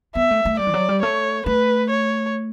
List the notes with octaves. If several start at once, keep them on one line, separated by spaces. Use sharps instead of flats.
B3 E5
A3
A3
G3 D5
E3
F#3
G3
A3 C#5
A3 B4
C#5